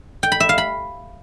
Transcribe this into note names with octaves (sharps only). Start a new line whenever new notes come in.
G5
B5
E5
F5
B5